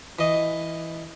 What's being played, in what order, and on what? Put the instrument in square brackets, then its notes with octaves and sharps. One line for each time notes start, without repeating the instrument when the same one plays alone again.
[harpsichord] E3 D#5